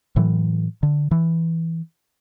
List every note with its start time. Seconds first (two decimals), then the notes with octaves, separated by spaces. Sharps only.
0.16 A2 E3 F#3
0.83 D3
1.11 E3